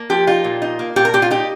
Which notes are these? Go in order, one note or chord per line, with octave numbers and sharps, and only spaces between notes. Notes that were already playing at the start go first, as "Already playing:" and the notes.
Already playing: A#3
F3 G4
D#4 F4
A#2
D#4
A#3
A#2 G4
A#4
A#2 G4
F4
D#4 G4